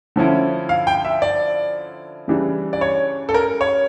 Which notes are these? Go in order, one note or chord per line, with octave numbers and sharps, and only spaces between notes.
D3 F3 C#4 E4
F5
G5
E5
D5
C#3 E3 G3 D4
D5
C#5
A4
A#4
C#5